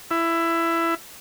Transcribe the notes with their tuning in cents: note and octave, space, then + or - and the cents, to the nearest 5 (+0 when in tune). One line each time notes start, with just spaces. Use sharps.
E4 +15